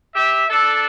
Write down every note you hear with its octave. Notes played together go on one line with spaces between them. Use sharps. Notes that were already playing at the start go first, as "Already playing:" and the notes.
G4 E5
D4 A4